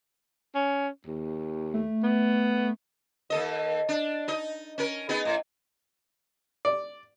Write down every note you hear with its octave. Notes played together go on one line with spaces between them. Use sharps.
C#4
D#2
A3
B3
D#2 A4 D#5
D4
D#4 D#5
C#4 A#4
B3 D#4 G#4
A2
D5